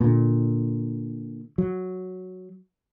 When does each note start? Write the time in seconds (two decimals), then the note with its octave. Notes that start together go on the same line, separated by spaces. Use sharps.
0.01 A#2 D3
1.58 F#3